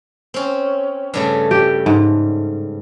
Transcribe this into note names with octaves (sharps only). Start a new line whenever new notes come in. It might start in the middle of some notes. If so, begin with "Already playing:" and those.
C4 C#4
G2 C#3 A3
G4
G#2